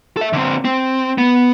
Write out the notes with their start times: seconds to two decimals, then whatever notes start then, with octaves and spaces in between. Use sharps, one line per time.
0.17 A4 E5
0.33 D3 C4
0.65 C4
1.18 B3